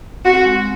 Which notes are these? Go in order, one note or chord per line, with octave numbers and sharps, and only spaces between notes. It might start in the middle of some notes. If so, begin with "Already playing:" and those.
C4 F#4
G#3